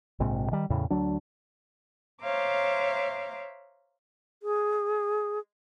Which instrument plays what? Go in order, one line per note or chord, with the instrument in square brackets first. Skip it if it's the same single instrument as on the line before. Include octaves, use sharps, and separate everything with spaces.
[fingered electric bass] A#1 G#2 C3
D#3 G3
E2 A2 C#3
D2 F#3 D4
[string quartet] C5 C#5 E5 F5 A#5 D6
[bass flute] G#4